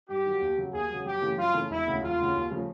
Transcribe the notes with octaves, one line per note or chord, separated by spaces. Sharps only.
G2 G4
D#3 F#3
D#2
C#3 F#3
D#2 G#4
C#3 F#3
F#2 G4
C#3 E3 A3
F#2 F4
C#3 E3 A3
E1 E4
D2 C#3
E1 F4
D2 C#3
D#2
C#3 F3 A3